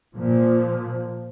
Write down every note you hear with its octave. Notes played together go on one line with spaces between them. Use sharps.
A#2 F3